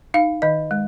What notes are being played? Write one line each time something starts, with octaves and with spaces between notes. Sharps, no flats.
D#4 F5
D#3 D#5
G#3